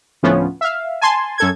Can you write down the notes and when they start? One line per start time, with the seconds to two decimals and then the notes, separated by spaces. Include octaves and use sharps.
0.23 D2 A2 F3 B3 C#4
0.61 E5 F5
1.01 G#5 A5 C6
1.38 F#2 A4 G#6